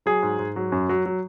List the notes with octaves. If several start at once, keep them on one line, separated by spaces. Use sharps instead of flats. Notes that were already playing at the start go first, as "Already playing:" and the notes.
F#3 G#4
G#2
G#2
F#3
F#2
F#3
F#3